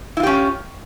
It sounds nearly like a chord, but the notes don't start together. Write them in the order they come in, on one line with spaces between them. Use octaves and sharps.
E4 F4 G4 C#4